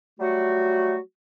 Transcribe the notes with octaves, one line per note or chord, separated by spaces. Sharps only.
F#3 G3 A3 F#4